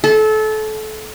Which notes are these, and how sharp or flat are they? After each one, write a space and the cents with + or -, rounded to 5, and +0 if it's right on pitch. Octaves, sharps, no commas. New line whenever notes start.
A4 -25